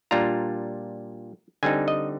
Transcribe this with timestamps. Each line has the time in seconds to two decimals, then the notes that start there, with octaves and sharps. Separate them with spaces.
0.11 A#2 G3 D4 F4 A#5
1.63 D3 G3 C4 D#4 G#5
1.88 D#5